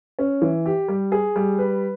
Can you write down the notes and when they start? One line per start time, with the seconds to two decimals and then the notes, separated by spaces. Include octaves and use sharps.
0.19 C#4
0.42 E3
0.66 G4
0.88 G3
1.12 G#4
1.36 G3
1.58 B4